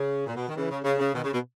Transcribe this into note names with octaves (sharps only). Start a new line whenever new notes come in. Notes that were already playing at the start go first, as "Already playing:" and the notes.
Already playing: C#3
A#2
B2
D#3
C#3 E3
C#3
C#3
C#3
B2 D#3
C#3
B2